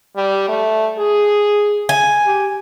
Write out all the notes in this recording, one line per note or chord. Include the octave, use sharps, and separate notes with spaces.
G3
A3
G#4
G#5
G4